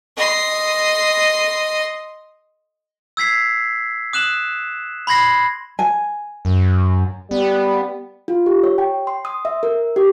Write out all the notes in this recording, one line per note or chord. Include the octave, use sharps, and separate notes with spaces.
D#5 C6
E6 G#6 B6 C7
D#6 F#6 E7 F#7
B5 C6 G#6 A#6 C7
G#5
F#2
G3 B3
F4
G4
C#5
G5
C6
D#6
E5
A#4
G4